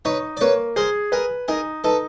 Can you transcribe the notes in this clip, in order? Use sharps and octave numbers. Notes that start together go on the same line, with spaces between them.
D#4 B4 C#5
D5
A#3 B4 C#5
G#4 A#4 C5
G#4 A#4 B4
D#4 G#4 A#4
D#4 A4 B4